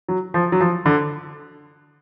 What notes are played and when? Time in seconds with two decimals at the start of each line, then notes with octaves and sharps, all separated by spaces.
0.09 F#3
0.34 F3
0.52 F#3
0.61 F3
0.86 D3